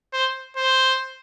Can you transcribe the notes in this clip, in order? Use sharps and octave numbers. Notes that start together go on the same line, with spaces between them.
C5
C5